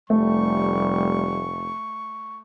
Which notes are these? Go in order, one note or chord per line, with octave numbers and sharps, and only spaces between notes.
F1 G3 A3 C#6